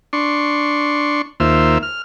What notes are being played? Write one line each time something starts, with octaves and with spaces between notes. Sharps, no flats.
D4 C6 C#6
D#2 A#3 F4 C5 E5
F6